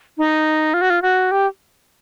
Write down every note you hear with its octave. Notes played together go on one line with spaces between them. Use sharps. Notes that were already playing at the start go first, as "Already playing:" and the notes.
D#4
F4
F#4
F4
F#4
G4